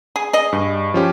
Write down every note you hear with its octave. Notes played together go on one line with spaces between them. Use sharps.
G#4
G#4 D#5
G2
F3 C#4 G4